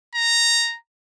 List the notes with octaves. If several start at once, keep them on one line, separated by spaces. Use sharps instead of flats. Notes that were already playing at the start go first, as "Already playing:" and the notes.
A#5